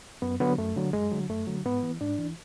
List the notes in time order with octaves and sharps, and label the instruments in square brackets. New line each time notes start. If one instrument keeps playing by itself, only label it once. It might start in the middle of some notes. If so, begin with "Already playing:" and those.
[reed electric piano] F#2 B3
D3 F#3 B3
F#2 A3
D3 F#3
F#2 G#3
D3 F#3
F#2 A3
D3 F#3
G#2 B3
E3
G#2 D4
E3